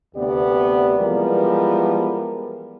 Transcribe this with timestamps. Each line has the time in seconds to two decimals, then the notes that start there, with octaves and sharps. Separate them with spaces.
0.15 D2 C3 B3 G4 D5
0.99 E3 F3 G3 G#3 B3 A#4